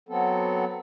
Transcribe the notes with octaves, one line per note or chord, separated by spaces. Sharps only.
F#3 B3 C4 A4